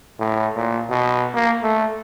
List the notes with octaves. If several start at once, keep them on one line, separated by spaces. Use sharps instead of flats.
A2
A#2
B2
A#3
A3